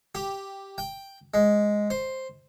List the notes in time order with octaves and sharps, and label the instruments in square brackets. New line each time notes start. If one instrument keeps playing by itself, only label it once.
[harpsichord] G4
G5
G#3
C5